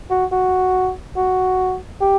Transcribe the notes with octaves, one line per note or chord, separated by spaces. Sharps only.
F#4
F#4
F#4
G4